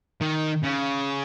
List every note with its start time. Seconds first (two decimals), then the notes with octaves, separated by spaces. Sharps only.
0.21 D#3
0.64 C#3